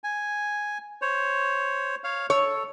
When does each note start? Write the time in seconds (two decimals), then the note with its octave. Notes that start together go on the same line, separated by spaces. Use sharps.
0.04 G#5
1.02 C5 C#5
2.04 C#5 F5
2.30 A4 C#5